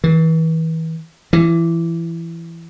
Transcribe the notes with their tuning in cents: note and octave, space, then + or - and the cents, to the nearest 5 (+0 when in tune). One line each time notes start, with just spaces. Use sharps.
E3 -35
E3 +20